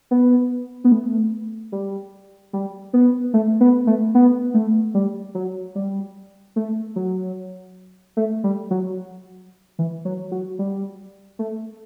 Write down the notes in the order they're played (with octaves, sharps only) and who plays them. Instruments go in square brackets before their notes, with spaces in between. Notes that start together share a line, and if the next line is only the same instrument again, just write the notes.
[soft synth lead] B3
B3
A3
G3
G3
B3
A3
B3
A3
B3
A3
G3
F#3
G3
A3
F#3
A3
G3
F#3
E3
F#3
F#3
G3
A3